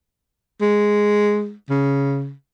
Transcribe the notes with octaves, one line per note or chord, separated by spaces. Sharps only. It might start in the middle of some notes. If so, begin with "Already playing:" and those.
G#3
C#3